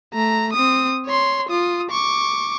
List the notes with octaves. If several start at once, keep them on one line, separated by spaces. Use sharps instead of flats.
A3 A#5
C4 D#6
C#5 C6
F4 D#6
C#6 D6